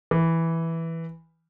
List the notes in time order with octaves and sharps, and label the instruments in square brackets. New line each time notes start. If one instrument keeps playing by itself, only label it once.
[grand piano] E3